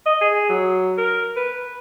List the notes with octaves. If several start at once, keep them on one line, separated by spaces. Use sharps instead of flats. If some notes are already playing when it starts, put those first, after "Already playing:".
D#5
G#4
F#3
A#4
B4